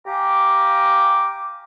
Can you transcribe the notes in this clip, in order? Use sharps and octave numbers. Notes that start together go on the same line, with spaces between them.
G4 F5 G#5 A#5 D6